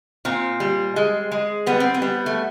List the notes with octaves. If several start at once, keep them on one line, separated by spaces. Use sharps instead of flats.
A#2 C4
G3
G#3
G#3
G3 B3
C4
B3
G3
A3